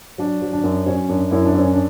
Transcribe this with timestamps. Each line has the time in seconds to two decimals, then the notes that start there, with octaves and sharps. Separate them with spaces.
0.18 F#3 D4
0.42 F#3
0.53 D4
0.63 F#2
0.86 F#3 C#4
1.09 F#2 D4
1.31 F#2 E4
1.45 D4
1.54 F#2
1.59 C#4
1.73 D4